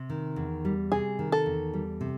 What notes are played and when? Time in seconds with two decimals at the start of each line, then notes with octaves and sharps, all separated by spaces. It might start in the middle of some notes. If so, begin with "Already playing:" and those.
Already playing: C3
0.10 D#3
0.36 E2
0.65 G3
0.92 C3 G#4
1.19 D#3
1.32 A4
1.46 E2
1.74 G3
2.01 C3